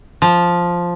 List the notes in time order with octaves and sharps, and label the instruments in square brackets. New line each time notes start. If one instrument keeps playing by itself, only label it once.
[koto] F3